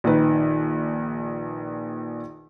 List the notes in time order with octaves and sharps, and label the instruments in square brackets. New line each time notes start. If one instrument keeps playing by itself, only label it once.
[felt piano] A#1 D#3 B4